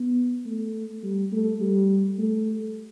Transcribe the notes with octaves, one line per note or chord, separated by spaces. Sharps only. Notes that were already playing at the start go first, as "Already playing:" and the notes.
Already playing: B3
A3
G3
A3
G3
A3